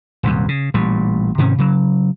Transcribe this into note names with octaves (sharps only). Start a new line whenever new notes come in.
D#1 C2 F#2
C#3
A1 A#2 G3
G#2 C3 D#3 C#4
C#3 F#3